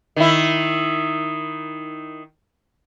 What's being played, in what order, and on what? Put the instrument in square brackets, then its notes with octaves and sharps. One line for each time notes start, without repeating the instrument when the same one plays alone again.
[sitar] D#3 E4